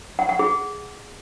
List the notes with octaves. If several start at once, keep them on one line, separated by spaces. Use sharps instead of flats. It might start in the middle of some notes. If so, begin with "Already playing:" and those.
F#5
F#5
G#4